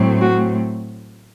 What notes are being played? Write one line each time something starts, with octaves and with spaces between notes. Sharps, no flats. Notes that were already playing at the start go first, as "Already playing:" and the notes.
Already playing: A2 F#3 A3 C4
F#4